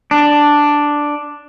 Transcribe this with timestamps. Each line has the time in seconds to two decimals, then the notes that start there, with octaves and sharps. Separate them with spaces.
0.11 D4